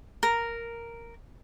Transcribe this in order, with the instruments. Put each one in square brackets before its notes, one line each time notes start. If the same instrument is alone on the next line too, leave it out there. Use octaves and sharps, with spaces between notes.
[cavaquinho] A#4